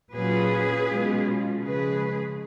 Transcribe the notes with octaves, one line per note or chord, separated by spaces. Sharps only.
A#2 F#3 C#4 F4 G#4 B4
B2 G#3 C#4 F4
C#3 F3 G#3 G#4 B4